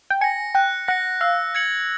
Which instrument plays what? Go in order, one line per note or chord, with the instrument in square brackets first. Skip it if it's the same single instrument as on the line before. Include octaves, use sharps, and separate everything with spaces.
[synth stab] G5
[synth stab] G#5 [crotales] A#6 C#7
[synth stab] G5 [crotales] F#6
[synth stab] F#5 [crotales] A#6 C#7
[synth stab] F5 [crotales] E6
[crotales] G#6 C#7 F#7